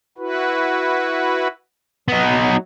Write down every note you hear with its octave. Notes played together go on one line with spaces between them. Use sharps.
E4 F#4 B4
F#3 B3 D#4